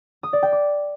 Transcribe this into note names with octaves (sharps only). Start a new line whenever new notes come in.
D#6
D5
G5
D6